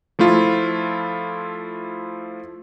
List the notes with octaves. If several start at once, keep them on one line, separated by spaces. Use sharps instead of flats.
F3 A3 E4 F4